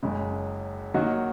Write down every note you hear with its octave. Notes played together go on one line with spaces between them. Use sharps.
F#1 F#2 C#3 G#3
D#3 F#3 A#3 D#4 F#4